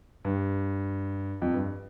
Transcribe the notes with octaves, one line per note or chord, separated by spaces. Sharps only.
G2
F2
G2